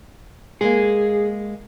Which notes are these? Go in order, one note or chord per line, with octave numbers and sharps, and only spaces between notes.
G#3 A#3 G#4